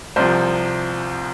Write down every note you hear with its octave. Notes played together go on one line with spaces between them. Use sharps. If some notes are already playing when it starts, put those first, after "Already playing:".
C2 C3 F3 C5